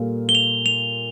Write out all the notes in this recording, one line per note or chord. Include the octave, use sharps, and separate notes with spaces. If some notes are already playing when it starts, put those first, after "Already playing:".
Already playing: A#2 G3 A#3 F4 A4
G7
F7
F7